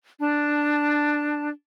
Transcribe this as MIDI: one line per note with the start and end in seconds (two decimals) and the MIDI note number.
0.20 1.49 62
0.20 1.49 81